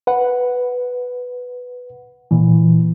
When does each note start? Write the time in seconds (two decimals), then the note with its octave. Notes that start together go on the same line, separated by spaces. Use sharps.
0.07 B4 F#5
2.31 A#2 E3